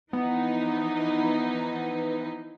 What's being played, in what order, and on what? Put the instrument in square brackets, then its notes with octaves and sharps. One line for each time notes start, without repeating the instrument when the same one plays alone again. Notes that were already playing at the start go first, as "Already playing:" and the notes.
[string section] E3 F3 D#4 [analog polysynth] B3